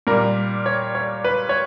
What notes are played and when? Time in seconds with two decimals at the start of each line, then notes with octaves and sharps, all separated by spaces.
0.07 A#2 G3 A#4
0.66 C#5
0.95 C#5
1.24 B4
1.49 C#5